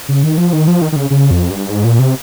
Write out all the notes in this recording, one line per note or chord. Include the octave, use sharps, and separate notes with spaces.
C#3
D#3
F3
D#3
F3
D#3
D#3
C#3
C#3
F2
G2
G#2
A#2
C3